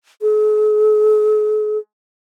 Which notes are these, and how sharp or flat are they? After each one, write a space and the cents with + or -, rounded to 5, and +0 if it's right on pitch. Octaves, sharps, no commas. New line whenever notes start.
G#4 +45